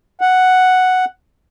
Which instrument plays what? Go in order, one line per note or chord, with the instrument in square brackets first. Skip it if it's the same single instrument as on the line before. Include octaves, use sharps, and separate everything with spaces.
[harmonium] F#5